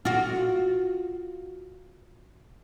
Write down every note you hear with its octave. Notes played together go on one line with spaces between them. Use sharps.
F4 F#4